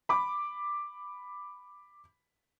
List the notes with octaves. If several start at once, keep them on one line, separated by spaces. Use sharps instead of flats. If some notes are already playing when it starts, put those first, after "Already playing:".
B5 D6